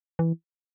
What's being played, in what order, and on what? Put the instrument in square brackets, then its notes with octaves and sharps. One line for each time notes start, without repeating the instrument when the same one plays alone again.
[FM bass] E3